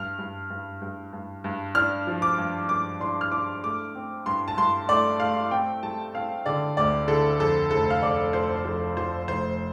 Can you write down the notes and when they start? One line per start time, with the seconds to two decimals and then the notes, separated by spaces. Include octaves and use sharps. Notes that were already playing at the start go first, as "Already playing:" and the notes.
Already playing: G2 F6
0.19 G2
0.50 G2
0.82 G2
1.13 G2
1.44 G2
1.75 D4 F6
2.07 F3
2.22 D6
2.38 G2
2.69 G2 D6
3.00 D4 C6
3.21 F6
3.32 D4 D6
3.63 A3 D6
3.95 C4
4.26 G2 C6
4.48 A5
4.57 G2 C6
4.88 A3 D5
5.19 A3 F5
5.51 C4 G5
5.83 G3 A5
6.14 C4 F5
6.46 D3 D5
6.77 D2 D5
7.08 D3 A4
7.40 F2 A4
7.71 F1 A4
7.90 F5
8.02 F1 D5
8.33 F3 C5
8.65 F3 A4
8.97 F3 C5
9.27 F1 C5